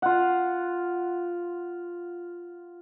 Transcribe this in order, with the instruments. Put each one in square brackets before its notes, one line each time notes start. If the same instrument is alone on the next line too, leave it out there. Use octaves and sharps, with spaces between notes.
[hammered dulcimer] F4 F#5